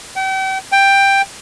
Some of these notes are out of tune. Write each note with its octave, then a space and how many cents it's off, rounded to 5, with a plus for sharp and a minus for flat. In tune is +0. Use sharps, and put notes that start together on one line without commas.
G5 -40
G5 +10